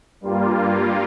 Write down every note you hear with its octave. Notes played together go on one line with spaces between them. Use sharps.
G2 G3 A#3 F4